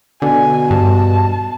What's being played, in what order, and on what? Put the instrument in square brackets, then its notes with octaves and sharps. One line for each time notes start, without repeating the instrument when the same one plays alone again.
[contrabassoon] B2 [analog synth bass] D3 [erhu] G#5
[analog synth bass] G2 [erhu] A5